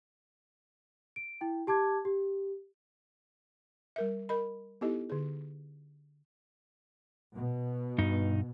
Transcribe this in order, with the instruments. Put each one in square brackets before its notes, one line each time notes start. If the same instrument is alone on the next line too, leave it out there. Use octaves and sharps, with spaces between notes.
[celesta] D7
E4 G5
G4 A5 D6 G#6
G4
[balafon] G3 A#4 E5
A#4 D#5 B5
B3 D#4 E4 G4 A4 D#5
D3 G#4
[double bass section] B2
[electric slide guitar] G2 D#4